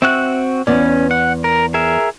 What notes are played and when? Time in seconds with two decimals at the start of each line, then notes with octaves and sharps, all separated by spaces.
0.02 C4 F#4 E5 F#6
0.67 E2 B3 C#4 D5
1.11 F#5
1.44 A#4
1.74 G#4 A#4 E5